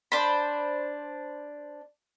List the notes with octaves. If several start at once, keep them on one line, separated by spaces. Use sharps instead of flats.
D4 C5 B5